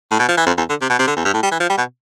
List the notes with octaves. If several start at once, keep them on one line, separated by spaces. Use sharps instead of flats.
A2
B2
F3
E3
F2
E2
D3
C3
B2
C3
D3
E2
G2
A2
G3
E3
F3
G3
B2